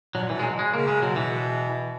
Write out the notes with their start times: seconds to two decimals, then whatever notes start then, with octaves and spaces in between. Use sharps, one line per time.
0.15 B2 F#3
0.23 A#2
0.30 B2 E3
0.39 G#3
0.43 F#3
0.59 G#3
0.73 C#3 A#3
0.88 G#3
1.02 B2 F#3
1.16 E3